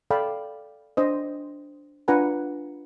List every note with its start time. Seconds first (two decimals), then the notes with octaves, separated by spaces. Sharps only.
0.10 A4 D5 F5 G5 A5 B5
0.97 D4 C5 D#5
2.08 D4 F4 B4 F#5 G#5 A#5